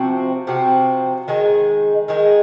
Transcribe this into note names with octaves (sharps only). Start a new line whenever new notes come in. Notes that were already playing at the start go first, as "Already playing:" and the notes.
Already playing: C3 F3 C4 F#4
C3 F3 C4 F#4
D#3 G#3 D#4 G#4
D#3 G#3 D#4 G#4